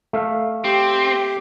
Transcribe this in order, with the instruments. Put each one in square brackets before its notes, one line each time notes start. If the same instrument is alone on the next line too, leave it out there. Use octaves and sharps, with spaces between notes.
[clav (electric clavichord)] A3 E5 F5
[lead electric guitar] C4 [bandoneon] G4